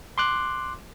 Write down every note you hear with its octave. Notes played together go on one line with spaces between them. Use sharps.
C6 D6 F#6